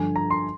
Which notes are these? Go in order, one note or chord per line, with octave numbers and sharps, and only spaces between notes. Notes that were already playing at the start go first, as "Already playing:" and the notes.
Already playing: G2 D3 F3 G#5
A#5
C6